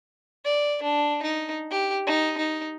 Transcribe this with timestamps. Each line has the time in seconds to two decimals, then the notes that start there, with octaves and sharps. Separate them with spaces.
0.45 D5
0.83 D4
1.22 D#4
1.71 G4
2.07 D#4
2.38 D#4